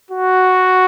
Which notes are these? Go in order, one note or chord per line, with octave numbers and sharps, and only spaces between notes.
F#4